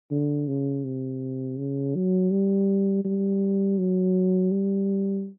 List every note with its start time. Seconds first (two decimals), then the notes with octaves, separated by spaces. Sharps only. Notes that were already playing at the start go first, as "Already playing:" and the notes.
0.11 D3
0.47 C#3
0.84 C3
1.57 C#3
1.95 F#3
2.31 G3
3.04 G3
3.78 F#3
4.51 G3